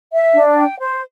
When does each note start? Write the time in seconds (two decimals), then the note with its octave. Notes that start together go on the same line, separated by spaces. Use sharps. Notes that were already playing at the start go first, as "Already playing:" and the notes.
0.13 E5
0.35 D4
0.57 G5
0.80 C5